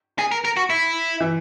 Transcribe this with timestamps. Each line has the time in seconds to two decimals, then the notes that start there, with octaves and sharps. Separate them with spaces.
0.19 G#4
0.32 A#4
0.45 A#4
0.57 F#4
0.70 E4
1.20 E3